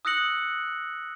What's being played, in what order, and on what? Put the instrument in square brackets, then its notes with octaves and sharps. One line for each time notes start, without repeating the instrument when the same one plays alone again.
[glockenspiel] D#6 E6 F#6 A#6 C#7 F#7